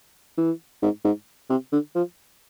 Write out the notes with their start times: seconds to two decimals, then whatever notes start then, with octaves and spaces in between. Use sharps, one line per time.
0.37 E3
0.82 G#2
1.05 G#2
1.50 C3
1.72 D3
1.95 F3